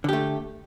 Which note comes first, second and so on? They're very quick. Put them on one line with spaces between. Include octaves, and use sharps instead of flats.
D3 G4 A3